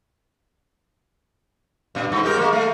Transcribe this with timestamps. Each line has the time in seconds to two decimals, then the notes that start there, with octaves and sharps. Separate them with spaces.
1.95 G2 A#2
2.12 G2
2.23 G#3 G4 A#4
2.37 G#3 A#3
2.53 A3